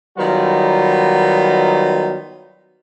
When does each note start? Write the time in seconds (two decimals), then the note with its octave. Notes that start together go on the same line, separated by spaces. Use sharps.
0.18 D#3 F#3 G3 B3 D#4 F4